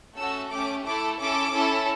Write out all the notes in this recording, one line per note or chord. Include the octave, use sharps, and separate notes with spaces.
A3 C#4 F#4 A4 E6
A3 C#4 G4 D6
A3 E4 A4 D6
C#4 E4 A4 D6
C#4 E4 A4